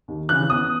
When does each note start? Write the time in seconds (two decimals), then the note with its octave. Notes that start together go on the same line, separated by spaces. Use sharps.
0.08 D#2
0.29 C#3 E3 F#6
0.50 E2 D#6